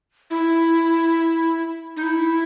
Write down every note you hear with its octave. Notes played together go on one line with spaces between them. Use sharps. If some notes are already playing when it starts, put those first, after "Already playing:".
E4
D#4
E4